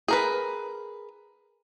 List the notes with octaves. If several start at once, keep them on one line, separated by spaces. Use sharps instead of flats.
G#4 A#4 B4